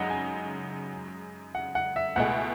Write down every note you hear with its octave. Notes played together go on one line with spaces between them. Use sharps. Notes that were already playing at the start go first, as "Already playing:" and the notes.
Already playing: F#2 C#3 G#3 D#4 F#5
G#5
F#5
F#5
E5
C#2 B2 A3 E4 G#4 F#5